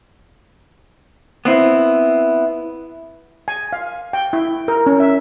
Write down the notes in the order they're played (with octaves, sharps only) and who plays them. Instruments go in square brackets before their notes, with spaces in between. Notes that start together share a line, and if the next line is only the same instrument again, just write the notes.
[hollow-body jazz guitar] B3 C4 E4
[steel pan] G#5
F5
G5
E4
A#4
C#4
E5